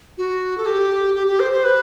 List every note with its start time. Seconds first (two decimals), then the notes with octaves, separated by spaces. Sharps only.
0.18 F#4
0.58 A4
0.66 G4
1.15 G4
1.27 G4
1.40 C5
1.52 C5
1.64 B4